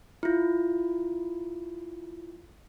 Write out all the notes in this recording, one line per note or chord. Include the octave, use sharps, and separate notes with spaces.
E4 F4